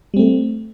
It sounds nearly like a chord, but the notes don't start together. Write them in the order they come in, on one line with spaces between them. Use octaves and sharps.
G3 C4 A3